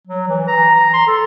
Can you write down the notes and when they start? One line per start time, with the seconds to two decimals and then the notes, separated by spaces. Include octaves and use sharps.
0.07 F#3
0.28 E3
0.47 A#5
0.75 A#5
0.93 C6
1.07 A4